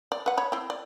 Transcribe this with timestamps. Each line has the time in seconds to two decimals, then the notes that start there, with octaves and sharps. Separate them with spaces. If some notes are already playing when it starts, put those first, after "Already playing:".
0.12 D5
0.26 B4 F#5
0.37 C#5 B5
0.52 C4 E4
0.70 D5